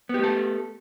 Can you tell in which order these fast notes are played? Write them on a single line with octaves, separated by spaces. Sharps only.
B3 G4 A3 A4